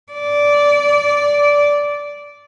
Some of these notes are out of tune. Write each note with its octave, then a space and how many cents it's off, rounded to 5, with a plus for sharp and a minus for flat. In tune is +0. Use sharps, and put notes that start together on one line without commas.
D5 -15